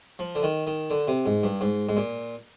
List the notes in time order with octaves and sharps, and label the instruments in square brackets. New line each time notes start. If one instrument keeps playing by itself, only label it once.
[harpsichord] F3
D3
D#3
D#3
D3
C3
G#2
G2
G#2
G#2
A#2